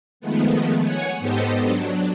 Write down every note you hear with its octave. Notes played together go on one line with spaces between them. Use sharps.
D#3 F3 G#3 A3 B3
C#5 F#5 G#5 C#6
G#2 B3 G4 A4 C5 D#5
F#3 D4